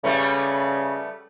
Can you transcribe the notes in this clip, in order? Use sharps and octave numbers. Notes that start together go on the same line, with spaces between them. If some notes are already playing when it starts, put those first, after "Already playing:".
C#3 G3 A3 B3